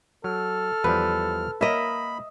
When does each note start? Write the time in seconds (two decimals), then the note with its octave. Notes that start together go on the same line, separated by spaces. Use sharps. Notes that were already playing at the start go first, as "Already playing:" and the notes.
0.24 F#3 A4 F6
0.84 E2 F3 G3 B4
1.61 A#3 A#4 D#5 E5 B5